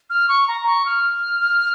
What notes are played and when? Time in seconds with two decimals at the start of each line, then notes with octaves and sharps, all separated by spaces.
0.10 F6
0.29 C#6
0.48 A#5
0.67 C#6
0.86 F6